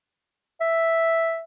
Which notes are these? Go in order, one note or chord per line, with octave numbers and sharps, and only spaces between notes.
E5